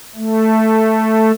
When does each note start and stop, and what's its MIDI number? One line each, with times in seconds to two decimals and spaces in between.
0.16 1.32 57